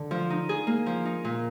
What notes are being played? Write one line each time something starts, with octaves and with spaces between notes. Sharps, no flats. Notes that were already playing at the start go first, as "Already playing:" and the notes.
Already playing: D3
F3
D#4
G#4
A#3
F3
D#4
A#2